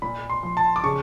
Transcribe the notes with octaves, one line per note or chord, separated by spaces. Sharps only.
A#2 B5
C6
F3
A5
D6
C#3 C#6